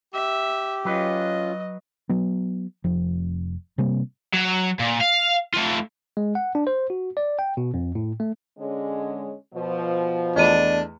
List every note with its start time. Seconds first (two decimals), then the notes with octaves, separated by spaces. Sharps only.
0.14 G4 E5
0.85 F#3 C#4 F4 B4 D#5
2.09 F#3 B3
2.84 F1 F3
3.78 C3 G3 A#3 C4
4.34 F#3
4.80 A#2
5.01 F5
5.54 A3 F4
6.17 G#3
6.35 F#5
6.55 D4
6.67 C5
6.90 F#4
7.17 D5
7.39 G5
7.57 B2
7.74 F2
7.95 A2
8.20 A3
8.59 D3 G#3 C#4
9.54 B2 F3
10.36 E2 A3 D4 D#5 B5 D#7